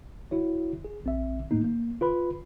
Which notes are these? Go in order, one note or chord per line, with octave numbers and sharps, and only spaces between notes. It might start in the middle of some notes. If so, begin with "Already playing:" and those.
E4 F#4 C#5
G#4
A#1 C4 E5
A2 A3 A#3 D#4
A#3
F4 B4 B5